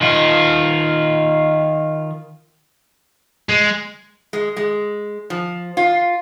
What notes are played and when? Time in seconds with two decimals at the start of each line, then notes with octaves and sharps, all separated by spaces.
0.01 D#3 F4
3.49 G#3
4.33 G#3
4.56 G#3
5.30 F3
5.77 F4